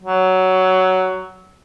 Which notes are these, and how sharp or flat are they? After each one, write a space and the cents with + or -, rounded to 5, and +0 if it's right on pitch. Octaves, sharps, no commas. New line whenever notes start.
F#3 +10